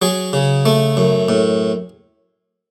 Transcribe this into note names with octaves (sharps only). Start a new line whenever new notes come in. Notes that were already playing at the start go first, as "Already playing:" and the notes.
F#3 G#4
C#3
A3
F#2
A2